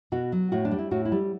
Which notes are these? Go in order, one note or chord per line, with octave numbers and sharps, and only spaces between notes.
B2 F#4
F#3
A2 F#4
D4
G3
E4
A2 F#4
E4
G3